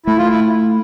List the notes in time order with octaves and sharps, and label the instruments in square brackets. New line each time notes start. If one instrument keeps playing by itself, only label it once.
[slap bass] A3 [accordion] E4
[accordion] F4
E4